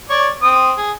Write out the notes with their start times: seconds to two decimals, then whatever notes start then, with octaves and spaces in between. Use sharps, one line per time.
0.10 C#5 D5 C#6
0.42 C4 D#6
0.78 G#4